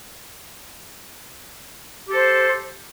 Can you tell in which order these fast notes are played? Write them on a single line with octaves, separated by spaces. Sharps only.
G4 A4 C5